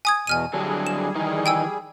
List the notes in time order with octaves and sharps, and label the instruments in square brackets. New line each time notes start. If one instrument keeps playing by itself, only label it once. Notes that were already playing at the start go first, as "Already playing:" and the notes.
[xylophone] G#5 D#6 G#6
[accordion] E2 B2 [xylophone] G#5 F6 D#7
[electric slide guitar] D3 F#3 D4 [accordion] G3 G#4
[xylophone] E7
[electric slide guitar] D#3 E3 D#4
[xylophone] G5 G#5 E6